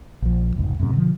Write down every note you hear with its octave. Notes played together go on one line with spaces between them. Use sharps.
A#1 F3
F1 C#2 G#2
F#2 A2 C3
B2 D3 D#3 F3